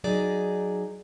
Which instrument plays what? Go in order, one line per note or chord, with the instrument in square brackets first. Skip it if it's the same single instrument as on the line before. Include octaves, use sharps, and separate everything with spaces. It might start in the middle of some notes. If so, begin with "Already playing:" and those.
[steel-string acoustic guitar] F#3 D#4 G#4 D5